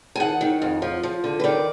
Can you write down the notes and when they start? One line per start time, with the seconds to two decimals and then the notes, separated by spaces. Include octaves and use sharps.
0.16 G#5
0.20 D#3 F#5
0.41 D#3
0.62 F2
0.82 F3
1.03 F3
1.24 D3
1.40 B4
1.44 D#3 D5